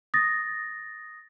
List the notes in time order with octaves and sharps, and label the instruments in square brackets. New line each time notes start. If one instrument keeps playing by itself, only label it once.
[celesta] D#6 A6 A#6